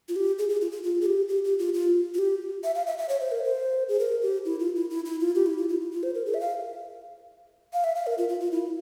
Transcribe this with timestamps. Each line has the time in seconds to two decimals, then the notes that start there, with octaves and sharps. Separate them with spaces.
0.09 F4
0.16 G4
0.39 G#4
0.49 G#4
0.61 F4
0.72 F4
0.83 F4
1.01 G#4
1.06 G4
1.28 G4
1.44 G4
1.59 F4
1.74 F4
2.14 F4
2.19 G4
2.64 E5
2.75 F5
2.87 E5
2.98 E5
3.09 C#5
3.21 C5
3.32 A#4
3.44 C5
3.89 G#4
4.00 A#4
4.22 G4
4.45 E4
4.60 F4
4.76 E4
4.90 E4
5.05 E4
5.21 F4
5.35 G4
5.46 E4
5.58 F4
5.69 E4
5.80 F4
5.92 F4
6.03 C5
6.15 A#4
6.26 G#4
6.34 E5
6.41 F5
7.73 F5
7.84 E5
7.96 F5
8.07 A#4
8.18 F4
8.29 F4
8.40 F4
8.52 E4